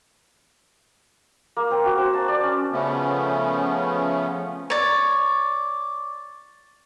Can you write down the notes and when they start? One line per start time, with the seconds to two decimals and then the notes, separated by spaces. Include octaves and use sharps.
1.57 A#3
1.71 C4
1.85 F#4
1.98 C5
2.13 A5
2.28 D5
2.43 C#4
2.72 C#3 F3 A3 B3 C#4
4.70 C#5 D5